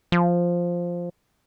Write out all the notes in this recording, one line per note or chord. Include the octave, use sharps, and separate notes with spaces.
F3